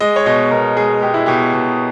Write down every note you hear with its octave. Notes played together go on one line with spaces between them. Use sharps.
G#3 D#5
C#5
B2 D#5
B2 A#4
G#3 G#4
G#3 G4
E4
B2 G4
B2